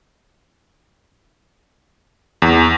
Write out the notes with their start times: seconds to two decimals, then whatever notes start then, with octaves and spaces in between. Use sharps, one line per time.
2.42 E2